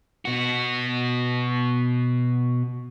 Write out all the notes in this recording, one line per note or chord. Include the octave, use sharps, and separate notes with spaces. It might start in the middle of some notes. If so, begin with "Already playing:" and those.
B2 F#4